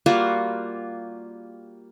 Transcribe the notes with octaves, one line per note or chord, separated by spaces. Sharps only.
G3 A#3 F4 F#4